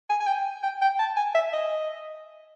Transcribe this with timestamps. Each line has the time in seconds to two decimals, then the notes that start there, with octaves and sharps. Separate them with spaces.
0.10 G#5
0.20 G#5
0.27 G5
0.63 G5
0.82 G5
0.99 A5
1.17 G#5
1.35 E5
1.53 D#5